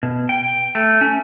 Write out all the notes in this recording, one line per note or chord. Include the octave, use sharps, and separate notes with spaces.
B2
G5
A3
C#4